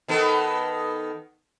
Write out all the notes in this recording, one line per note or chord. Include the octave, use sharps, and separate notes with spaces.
D#3 B3 A4